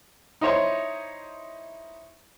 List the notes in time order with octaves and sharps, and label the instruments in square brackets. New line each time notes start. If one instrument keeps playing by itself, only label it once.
[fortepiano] D#4 E4 C5 C#5 C6